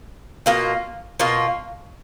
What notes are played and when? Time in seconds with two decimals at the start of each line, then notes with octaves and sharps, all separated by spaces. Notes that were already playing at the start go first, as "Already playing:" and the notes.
0.46 B2 A#3 F4
1.20 B2 A#3 F4